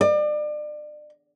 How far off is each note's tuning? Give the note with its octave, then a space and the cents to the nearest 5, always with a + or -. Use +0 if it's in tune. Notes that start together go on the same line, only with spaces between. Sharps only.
D5 +35